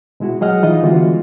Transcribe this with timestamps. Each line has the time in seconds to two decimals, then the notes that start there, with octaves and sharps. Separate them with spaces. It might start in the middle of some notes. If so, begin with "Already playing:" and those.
0.20 B2 G#3 E4 F#4
0.41 F#3 G#4 D#5 F#5 F6
0.63 E3 G3 D#4 F4 D#5
0.83 D3 E3 G#3 B3 F4 F#4